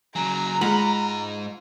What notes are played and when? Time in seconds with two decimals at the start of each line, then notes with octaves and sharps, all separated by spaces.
0.15 C#3 F#3 G#5 A#5
0.61 G#2 G#3 F4 D#5 F#5 B5